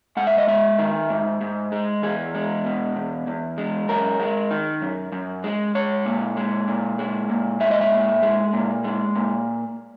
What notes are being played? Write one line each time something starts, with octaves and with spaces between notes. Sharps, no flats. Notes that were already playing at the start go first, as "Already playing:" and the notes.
G#2 F#5
E5
D#5
G#3 E5
D#3
G#2
G#2
G#3
E2 G#4
G#3
B2
E2
E2
G#3
F#2 A#4
G#3
D#3
F#2
F#2
G#3
G#3 C#5
A#2
G#3
A#2
G#3
A#2
G#3 E5
D#5
E5
A#2
G#3
A#2
G#3
A#2